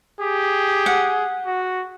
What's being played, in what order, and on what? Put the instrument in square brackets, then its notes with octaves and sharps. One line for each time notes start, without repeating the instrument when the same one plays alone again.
[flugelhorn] G4 [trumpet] G#4
[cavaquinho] F#5
[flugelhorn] F#4